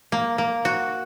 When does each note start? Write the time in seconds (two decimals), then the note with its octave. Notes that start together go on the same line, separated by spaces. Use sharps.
0.12 A#3
0.38 A#3
0.65 F#4